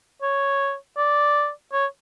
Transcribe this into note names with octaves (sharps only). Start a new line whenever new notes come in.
C#5
D5
C#5